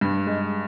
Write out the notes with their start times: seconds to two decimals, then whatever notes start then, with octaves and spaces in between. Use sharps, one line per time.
0.01 G2
0.27 G#3